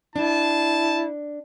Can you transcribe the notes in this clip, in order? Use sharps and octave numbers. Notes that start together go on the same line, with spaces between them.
D4 E4 A5